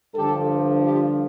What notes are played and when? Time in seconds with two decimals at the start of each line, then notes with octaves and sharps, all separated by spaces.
0.15 G2 D3 F3 G4 A4
0.81 F4 G4